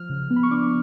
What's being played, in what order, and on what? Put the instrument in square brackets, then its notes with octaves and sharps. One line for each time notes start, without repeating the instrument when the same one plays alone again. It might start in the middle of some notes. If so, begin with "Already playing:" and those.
Already playing: [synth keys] F3 F6
C#3
B3
B5
C#6
D4 D6